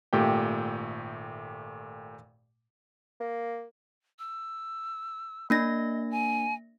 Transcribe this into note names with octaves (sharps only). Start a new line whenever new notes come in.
G#1 A#2 A3 G4 G5
A#3
E6
A#3 D4 D#5 A#6
G#5